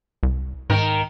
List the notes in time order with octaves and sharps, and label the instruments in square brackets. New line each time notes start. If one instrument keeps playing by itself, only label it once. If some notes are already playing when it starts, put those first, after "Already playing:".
[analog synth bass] C2
[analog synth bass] G#2 [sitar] D#3 A#4